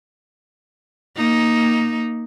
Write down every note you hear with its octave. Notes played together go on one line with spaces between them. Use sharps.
A#3 D#4